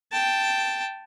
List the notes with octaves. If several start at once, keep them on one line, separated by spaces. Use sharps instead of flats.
G5 A5